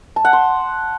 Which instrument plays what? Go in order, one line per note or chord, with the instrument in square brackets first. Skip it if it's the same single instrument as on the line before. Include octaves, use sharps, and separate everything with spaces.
[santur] A5
F#5
C6